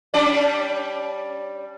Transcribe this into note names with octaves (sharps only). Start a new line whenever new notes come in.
G3 C#4 D5